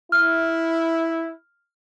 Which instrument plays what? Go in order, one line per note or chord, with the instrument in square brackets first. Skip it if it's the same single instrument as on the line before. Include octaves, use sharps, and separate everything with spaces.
[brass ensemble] E4 [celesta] F6